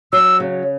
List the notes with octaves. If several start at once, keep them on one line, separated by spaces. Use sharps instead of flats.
F#3 E6
C#3